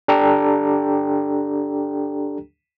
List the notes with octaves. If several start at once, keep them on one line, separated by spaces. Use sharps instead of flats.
D4 G4 A4 G5 A#5